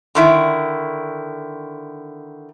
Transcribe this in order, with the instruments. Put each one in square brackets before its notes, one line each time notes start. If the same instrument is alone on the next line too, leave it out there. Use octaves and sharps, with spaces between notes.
[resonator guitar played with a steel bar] D3 D#3 E4